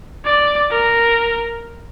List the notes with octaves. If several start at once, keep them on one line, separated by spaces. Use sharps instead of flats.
D5
A#4